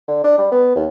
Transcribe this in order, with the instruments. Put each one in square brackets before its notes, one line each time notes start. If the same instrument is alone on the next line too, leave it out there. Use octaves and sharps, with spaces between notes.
[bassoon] D3
D4
G3
B3
D#2